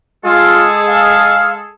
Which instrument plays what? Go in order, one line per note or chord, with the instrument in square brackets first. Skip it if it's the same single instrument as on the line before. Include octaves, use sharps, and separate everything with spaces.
[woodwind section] G#3 G#4 A4 [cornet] F4
[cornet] F5